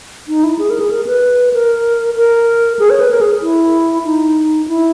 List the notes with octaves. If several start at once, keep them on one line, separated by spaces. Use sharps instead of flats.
D#4
E4
G#4
A#4
G#4
A#4
B4
A#4
A#4
G#4
C#5
B4
A#4
G#4
E4
D#4
E4